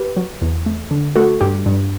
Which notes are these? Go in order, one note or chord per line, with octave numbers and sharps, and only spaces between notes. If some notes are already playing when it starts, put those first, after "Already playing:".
Already playing: G4 B4
F#3
E2
A3
D3
A3 F#4 A4
G2 G4
G2